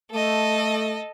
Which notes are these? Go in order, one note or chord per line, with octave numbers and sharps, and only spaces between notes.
A3 A4 D#5